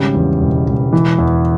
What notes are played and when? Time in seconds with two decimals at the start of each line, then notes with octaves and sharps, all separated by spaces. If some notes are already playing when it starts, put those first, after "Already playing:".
Already playing: G#1 C#3 G3
0.15 E2
0.41 E1
0.67 E1
0.92 E3
1.19 E2